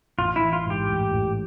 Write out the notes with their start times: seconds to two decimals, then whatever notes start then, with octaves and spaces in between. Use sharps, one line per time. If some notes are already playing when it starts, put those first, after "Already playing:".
0.18 A1 F4
0.36 E4
0.41 E3
0.53 F4
0.66 G#2 G4
0.89 A1
1.11 A1